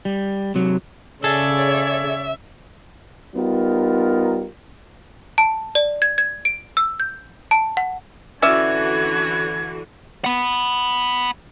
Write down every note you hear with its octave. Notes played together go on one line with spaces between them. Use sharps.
G3
C3 F#3
C#3 G#4 A4 C#5 D5 E5
G3 B3 D#4 F4 A#4
A5
D5
G#6
G#6
D7
E6
G6
A5
F#5
D3 E3 C#4 F#4 D5 E5 G#6
F#5 B5